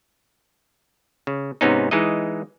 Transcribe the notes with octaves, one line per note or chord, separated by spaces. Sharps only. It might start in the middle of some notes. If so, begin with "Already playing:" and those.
C#3
G#2 C3 B3 C#4 D#4
E3 G#3 D#4 D#5